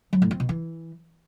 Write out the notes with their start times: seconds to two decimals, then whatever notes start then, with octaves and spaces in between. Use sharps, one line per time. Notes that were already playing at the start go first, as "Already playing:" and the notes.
0.13 F#3
0.22 A2
0.31 C4
0.40 B2
0.49 E3